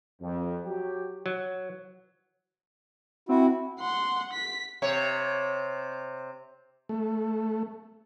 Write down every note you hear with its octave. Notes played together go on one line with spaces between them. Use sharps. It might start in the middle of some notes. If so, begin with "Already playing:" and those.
F2
F#3 G4
F#3
C4 E4 F#4
F#5 C6
B6
C3 C#5
A3